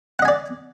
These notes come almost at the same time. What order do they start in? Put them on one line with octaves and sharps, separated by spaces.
F#5 D#5 G#5 D5